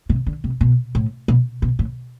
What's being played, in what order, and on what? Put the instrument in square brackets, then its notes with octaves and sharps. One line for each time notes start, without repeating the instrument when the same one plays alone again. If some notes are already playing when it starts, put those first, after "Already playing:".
[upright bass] C3
D3
C3
B2
A2
B2
B2
A2